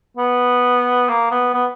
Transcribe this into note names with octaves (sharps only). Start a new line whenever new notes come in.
B3
A#3
B3
B3